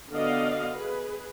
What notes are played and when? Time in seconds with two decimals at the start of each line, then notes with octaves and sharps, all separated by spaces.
0.11 D3 B3 F#4 D5 D#5 F5
0.73 G#4 B4